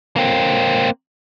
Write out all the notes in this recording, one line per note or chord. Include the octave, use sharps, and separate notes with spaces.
A#3 C4